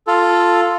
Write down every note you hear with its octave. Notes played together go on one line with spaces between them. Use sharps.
F4 A4